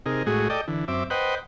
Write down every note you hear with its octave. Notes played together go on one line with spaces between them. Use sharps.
C3 D#4 G#4 A#4
A2 G#3 F#4 G#4
A4 D5 D#5 G5
D3 E3
F#2 C4 E5 D6
B4 C5 D#5 F#5 G5